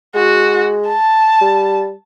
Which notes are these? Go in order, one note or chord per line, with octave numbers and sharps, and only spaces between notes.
G#3 F#4
A5
G3